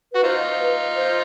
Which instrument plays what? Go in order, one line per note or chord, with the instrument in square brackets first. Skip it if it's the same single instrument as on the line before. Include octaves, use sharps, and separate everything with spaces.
[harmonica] F#4 [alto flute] B4
[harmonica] D#4 F4 [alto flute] C5
[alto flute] B4
C5